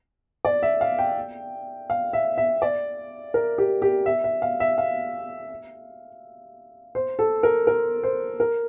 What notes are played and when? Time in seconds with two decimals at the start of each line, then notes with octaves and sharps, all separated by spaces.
0.45 D5
0.63 E5
0.81 F5
0.99 G5
1.90 F5
2.13 E5
2.38 E5
2.62 D5
3.34 A#4
3.58 G4
3.82 G4
4.06 E5
4.24 E5
4.42 F5
4.60 E5
4.78 F5
6.95 C5
7.19 A4
7.43 A#4
7.67 A#4
8.03 C5
8.40 A#4